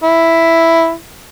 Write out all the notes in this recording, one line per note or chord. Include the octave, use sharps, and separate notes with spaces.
E4